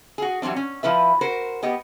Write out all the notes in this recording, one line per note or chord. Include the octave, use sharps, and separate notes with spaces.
F#4 G#4
E3 F#3 G3 C4 D4
C#4
F3 E4 B4 E5
F#4 A#4 C5
B3 G4 D#5